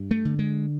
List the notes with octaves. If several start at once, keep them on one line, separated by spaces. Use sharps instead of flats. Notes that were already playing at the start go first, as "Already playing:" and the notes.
Already playing: G2
A3
D3
G#3